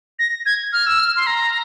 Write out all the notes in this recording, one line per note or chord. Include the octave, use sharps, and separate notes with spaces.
A#6
G#6
F6
E6
F6
C6
A#5